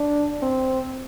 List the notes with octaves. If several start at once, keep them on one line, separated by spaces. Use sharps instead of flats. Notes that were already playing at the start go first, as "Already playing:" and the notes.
Already playing: D4
C4